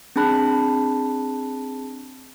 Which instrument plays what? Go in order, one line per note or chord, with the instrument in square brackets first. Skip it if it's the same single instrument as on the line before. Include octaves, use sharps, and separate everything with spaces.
[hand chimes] C4 D4 G#4 A5 B5 F#6